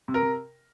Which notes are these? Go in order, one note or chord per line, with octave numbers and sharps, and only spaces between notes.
C3
A#4
C3